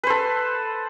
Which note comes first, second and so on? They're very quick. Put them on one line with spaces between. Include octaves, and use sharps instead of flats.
B4 C5 A4